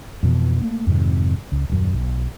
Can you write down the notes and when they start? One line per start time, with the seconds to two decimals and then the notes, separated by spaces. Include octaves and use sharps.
0.23 F2 B2 E3
0.59 A3 A#3 C4
0.87 F2 G#2 C3 D#3
1.52 C#2
1.70 D#1 F#2
1.93 B1